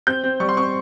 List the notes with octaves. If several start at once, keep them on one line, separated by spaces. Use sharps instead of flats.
C4 G6
C4
G3 C#6
C6
C4 C#6